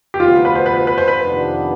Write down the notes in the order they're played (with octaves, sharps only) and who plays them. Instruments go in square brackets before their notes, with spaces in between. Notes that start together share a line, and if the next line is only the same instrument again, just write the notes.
[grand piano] G4
[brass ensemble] D2 C3 F3 B3 [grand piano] F4
[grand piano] B4
C5
B4
C5
B4
C5
B4
[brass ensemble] F2 C3 D#3 B3 D4